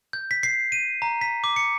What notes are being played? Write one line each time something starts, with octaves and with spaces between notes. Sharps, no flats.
G6
B6
C7
D#7
A#5
B6
D6
C#7